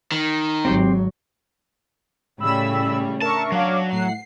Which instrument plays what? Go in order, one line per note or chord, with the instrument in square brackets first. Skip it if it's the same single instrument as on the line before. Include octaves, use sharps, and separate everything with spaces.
[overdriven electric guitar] D#3
[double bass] G#1 F#3 [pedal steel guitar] C4 G4 C6
[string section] A2 C#3 G3 [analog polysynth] B5 E6
[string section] D4 [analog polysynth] A#4 E5 C#6 [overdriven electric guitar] A5
[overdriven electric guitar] F#3 [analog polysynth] C#5 F5 D6
[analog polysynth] A2 F#5 [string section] C7